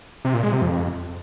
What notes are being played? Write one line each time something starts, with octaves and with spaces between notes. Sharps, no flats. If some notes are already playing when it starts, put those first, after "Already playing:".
C3
A#2
G#3
C3
F2